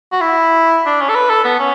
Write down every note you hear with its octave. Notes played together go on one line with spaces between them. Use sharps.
F#4
E4
D4
C#4
A4
B4
A4
B3
C#4